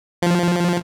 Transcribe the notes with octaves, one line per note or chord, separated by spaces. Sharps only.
F3